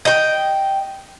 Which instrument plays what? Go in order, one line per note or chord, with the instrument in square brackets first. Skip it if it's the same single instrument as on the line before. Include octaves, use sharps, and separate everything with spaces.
[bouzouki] D#5 G5